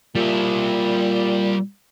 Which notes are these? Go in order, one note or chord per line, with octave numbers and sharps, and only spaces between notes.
A#2 G3 E5